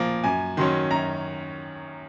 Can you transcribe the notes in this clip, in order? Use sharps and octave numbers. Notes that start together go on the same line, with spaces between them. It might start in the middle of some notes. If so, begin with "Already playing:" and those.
Already playing: A#2 F3 A#3
F#2 G#5
D#3 F#3 C#4 C6
F#2 A#5